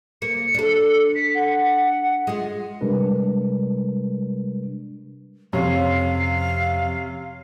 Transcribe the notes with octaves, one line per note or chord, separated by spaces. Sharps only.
A#3 C#7
D4 A4
B6
F#5
G#3 F4
C3 G3 G#3 D4 A#4 B4
F2 C3 C#4 F5